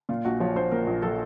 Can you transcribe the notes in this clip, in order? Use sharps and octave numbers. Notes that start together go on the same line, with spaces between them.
A#2 F4
A#1 F#4
F3 C#5
A#1 C5
A#2 A#4
A#1
F3 A4